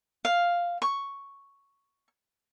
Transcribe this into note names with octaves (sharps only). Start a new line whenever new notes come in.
F5
C#6